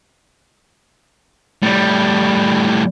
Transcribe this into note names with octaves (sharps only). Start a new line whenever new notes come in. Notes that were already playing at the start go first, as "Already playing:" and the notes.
A2 G3